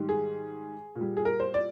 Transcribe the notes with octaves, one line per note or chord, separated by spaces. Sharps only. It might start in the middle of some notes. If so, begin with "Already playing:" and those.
Already playing: G#2 D#3 G3
G#4
A#2
G3
G#4
A#4
C5
D5